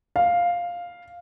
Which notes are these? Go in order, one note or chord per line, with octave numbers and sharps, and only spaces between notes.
F5